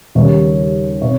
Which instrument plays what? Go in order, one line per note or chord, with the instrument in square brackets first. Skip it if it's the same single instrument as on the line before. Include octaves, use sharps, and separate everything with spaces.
[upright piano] D#2 C#3 G3 C#4 C#5
C3 C#5